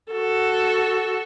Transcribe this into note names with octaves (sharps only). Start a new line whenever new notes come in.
F#4 A4